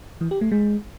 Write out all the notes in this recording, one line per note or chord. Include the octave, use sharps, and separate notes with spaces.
E3
G4
A3
G#3